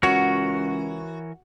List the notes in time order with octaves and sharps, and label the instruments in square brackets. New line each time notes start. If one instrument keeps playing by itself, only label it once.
[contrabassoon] C#2 [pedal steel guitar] E3 A#4 C#5 [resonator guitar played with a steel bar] F#4